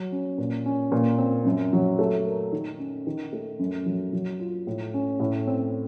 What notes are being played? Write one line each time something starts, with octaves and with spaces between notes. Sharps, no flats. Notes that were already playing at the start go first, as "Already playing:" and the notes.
Already playing: F#3
C#4
A#2
C#4
A#2
C4
F#2
F#3
A3
A#4
D#3
C#4
D#3
A3
F#2
F#3
F#3
F4
A2
C#4
A2
C4